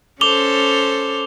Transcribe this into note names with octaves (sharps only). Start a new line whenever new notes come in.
C#4 A4 C5 D6 F7 G7